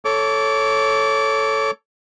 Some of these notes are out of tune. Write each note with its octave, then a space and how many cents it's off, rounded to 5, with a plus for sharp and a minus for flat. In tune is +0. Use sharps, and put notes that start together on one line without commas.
A4 +0 C#5 +0 D6 -25